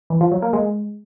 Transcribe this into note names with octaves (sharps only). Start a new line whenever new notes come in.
E3
F3
F#3
A#3
G#3